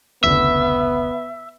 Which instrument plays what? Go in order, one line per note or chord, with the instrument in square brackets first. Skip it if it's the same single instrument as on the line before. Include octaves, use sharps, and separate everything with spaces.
[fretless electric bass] F1 C#2 D3 [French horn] B3 [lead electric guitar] E5